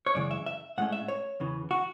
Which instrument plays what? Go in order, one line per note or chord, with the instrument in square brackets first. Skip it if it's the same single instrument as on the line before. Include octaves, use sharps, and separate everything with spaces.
[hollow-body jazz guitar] C#5
F#2 C#3 E3 G#3 D5
E5
E5
A2 G#3 C#4 F#5
E5
C#5
E2 C#3 E3
F#4